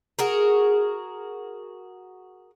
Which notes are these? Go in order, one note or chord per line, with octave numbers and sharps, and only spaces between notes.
F#4 G#4 A#4